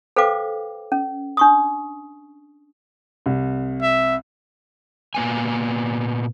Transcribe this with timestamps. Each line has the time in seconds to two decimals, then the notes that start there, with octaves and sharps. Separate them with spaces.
0.16 A4 B4 C5 F5 G5 D6
0.92 C#4
1.37 D4 C#6 D#6
3.26 C2
3.82 E5
5.15 A#2 A#3 B3 G#5